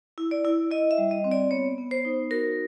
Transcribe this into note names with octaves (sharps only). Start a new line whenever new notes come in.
E4
D5
E4
E4 D#5
E5
G3
D#5
C4
D5
B3 C#5
B3
C5
D#4
F#4 A#4